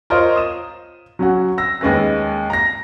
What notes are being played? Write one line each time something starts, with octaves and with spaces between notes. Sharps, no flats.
F4 A#4 C5 C#5 D#5
D#6 E7
F#3 C#4 F#4
E6 A#6
D#2 G#3 C#4 B4 A#6
A#5 A#6